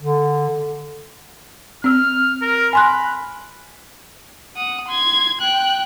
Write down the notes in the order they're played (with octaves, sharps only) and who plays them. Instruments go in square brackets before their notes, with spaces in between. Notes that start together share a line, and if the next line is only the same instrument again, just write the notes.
[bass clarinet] D3
[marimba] C4 E6 [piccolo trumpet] F6
[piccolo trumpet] A#4
[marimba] G#5 C6 F#6 [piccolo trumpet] B5
[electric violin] F#5 D#6
C6 G#6
G5 F#6